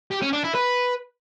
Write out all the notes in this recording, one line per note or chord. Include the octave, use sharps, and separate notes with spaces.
G4
C#4
D4
E4
B4